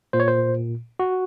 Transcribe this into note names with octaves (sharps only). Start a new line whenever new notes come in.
A#2 C5
C#5
C5
F#4